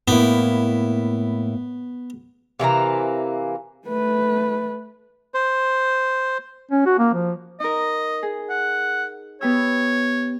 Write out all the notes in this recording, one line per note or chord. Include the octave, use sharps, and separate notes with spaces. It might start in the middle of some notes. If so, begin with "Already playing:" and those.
A2 A#3 B3 E4
C3 E3 A#3 A#5
A3 B4
C5
C#4
F#4
A#3
F3
D#4 A#4 D#5
G#4
F#5
B3 G4 C#5 E6